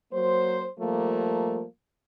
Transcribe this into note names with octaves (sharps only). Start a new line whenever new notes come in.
F#3 A#3 C5
F3 G3 A3 A#3